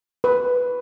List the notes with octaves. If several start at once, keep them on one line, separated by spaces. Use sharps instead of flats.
B4